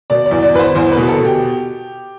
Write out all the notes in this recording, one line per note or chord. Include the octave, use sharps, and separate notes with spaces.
B2 D5
D5
E2
D5
E2 B4
C5
E2 C5
B4
B2
A4
B2
G4